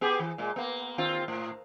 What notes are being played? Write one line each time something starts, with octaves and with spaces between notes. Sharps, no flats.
B3 G4 G#4
E3
A#2 G#3
A#3 B3
D#2 C4 F4
A2